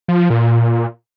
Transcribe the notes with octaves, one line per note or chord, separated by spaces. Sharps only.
F3
F3
A#2